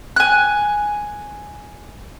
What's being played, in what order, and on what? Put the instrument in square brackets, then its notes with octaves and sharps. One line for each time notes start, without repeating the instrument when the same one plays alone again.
[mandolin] G#5 F#6